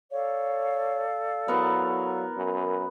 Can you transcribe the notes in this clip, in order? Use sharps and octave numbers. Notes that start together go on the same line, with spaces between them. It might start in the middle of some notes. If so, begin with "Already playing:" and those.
A4 C#5 D5 F5
F#3 B3 E4 A#4 C#6
F#2